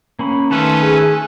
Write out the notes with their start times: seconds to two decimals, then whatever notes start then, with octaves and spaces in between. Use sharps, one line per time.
0.19 A#3 C#4 B5
0.51 D#3 A3 C#4 A4 B4 A5 C6
0.82 G#4 G#5